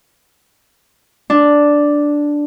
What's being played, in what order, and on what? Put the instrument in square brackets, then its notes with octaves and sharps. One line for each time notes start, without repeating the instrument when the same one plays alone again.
[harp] D4